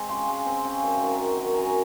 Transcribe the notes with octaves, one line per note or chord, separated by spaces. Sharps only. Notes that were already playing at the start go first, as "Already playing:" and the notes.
Already playing: G#3 C4
C#3 C6
G#3
C4
C#3
F#2
D#3
F#3
F#2
F#2 G#5 A#5